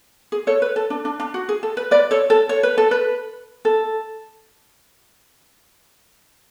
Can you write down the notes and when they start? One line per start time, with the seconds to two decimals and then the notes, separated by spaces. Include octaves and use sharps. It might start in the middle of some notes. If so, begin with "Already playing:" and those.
0.32 G#4
0.47 A4 C#5
0.62 B4
0.76 A4
0.90 D4
1.05 D4
1.20 D4
1.34 F#4
1.49 G#4
1.63 A4
1.77 B4
1.91 B4 D5
2.11 A4 C#5
2.30 A4
2.49 C#5
2.63 B4
2.78 A4
2.91 B4
3.65 A4